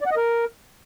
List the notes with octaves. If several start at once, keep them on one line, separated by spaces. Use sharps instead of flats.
D5
F#5
D#5
A#4